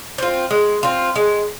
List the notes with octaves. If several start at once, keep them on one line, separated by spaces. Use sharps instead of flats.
C4 F4
G#3
C4 F4
G#3